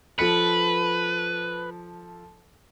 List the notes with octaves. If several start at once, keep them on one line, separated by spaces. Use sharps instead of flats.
F3 A4 B4 C#7